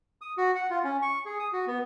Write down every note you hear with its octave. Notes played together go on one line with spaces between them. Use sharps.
D#6
F#4
F#5
F4
C#4
C#6
G#4
D#6
F#4
B3